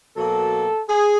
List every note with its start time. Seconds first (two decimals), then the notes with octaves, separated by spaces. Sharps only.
0.17 B2 F#3 A#3 A4
0.90 G#4